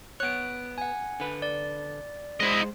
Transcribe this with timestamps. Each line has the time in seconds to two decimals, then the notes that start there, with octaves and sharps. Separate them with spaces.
0.20 B3 C#5 F#6 D7
0.78 F#5 G#5
1.20 D3 B4
1.42 D5
2.40 G#3 E4 C5 D#5